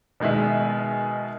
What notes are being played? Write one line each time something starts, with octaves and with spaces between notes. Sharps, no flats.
B2 D#3 G#3 G#4 E5